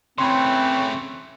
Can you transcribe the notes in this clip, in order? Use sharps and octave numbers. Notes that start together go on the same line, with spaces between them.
C#3 E3 A3 C4 C#5 B5 C6